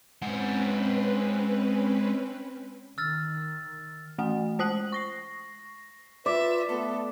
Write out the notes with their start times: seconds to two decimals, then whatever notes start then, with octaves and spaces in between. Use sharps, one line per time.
0.22 G#3 C4 C#4 B4 F#5
2.98 D#3 E6 F6 A6
4.18 E3 A3 F#5
4.59 G#3 C5 D#6 F#6 F#7
4.92 C#6 A#6 C7
6.26 F4 B4 D5 E5
6.70 A3 B3 A4